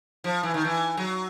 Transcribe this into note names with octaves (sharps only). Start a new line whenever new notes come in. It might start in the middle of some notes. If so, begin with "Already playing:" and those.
F3
E3
D#3
E3
F#3